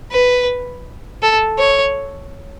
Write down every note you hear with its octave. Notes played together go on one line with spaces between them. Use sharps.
B4
A4
C#5